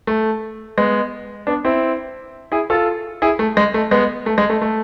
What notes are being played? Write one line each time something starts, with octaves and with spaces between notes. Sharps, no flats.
A3
G#3 B3
B3 D4
C4 E4
E4 G#4
F4 A4
E4 G#4
A3
G#3
A3
G#3 B3
A3
G#3
A3
A3